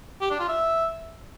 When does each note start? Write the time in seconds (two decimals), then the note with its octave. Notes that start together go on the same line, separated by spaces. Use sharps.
0.21 G4
0.30 D4
0.39 F4
0.48 E5